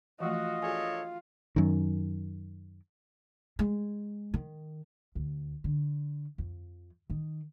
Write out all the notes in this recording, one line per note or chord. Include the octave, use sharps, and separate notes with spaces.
E3 F3 A3 F4 F#4 D#5
D4 F#4 G#4 A4 C#5 G#5
F#2 D#3
G#3
D#3
D2
D3
F2
D#3